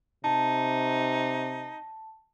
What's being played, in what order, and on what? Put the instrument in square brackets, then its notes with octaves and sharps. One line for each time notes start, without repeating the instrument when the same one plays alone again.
[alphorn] C3 [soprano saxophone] D#4 [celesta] A5